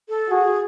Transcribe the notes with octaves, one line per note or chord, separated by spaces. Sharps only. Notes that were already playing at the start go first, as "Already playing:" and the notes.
A4
F#4 G#4